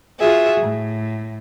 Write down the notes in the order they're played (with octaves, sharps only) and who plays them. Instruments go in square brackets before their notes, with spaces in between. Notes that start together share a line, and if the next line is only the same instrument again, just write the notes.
[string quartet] F4 F#4 G#4 E5
A2